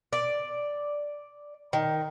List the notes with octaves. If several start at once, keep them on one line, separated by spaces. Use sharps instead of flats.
D5
D#3